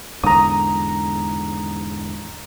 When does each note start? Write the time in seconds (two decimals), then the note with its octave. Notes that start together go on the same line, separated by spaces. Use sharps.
0.23 E2 G#2 D3 A#5 D#6